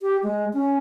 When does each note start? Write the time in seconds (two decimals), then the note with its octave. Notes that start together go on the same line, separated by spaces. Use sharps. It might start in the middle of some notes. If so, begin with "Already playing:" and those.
0.01 G4
0.23 G#3
0.53 C#4